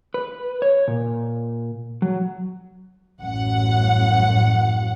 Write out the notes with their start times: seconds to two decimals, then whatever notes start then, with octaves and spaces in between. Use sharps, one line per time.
0.14 B4
0.62 C#5
0.88 A#2
2.02 F#3
3.20 A1 F#2 F#5